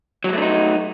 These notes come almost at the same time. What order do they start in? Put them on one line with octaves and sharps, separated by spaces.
F#3 G#3 A3 D4 D#4